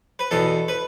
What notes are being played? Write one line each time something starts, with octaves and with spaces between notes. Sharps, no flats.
B4
E2 B2 A4
B4